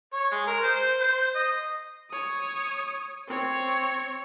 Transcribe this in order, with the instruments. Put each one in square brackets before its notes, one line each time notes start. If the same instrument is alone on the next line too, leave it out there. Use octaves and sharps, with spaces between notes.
[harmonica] C#5
G#3
A#4
C5
C5
D#5
[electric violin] C#5 D#6
C4 C#5